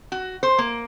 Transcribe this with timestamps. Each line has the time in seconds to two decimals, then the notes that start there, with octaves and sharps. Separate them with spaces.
0.12 F#4
0.43 C5
0.58 A#3